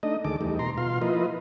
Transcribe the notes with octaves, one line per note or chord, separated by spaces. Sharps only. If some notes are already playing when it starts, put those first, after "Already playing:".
A3 D4 D#4 D#5
D2 D#3 G#3 A4 D6
E2 G3 A3 D#4
B2 A#5 C6
B2 F4 F5 C6
F3 A#3 E4 F4 B4 D#5